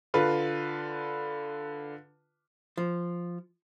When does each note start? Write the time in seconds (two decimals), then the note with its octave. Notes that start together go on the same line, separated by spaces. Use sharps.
0.14 D3 F4 B4
2.77 F3